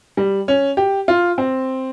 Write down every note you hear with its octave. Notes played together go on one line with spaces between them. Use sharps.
G3
C#4
G4
F4
C4